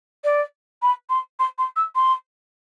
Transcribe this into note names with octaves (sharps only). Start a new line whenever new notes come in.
D5
B5
C6
C6
C6
E6
C6